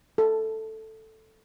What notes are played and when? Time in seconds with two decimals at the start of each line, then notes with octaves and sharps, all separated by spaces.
0.18 A4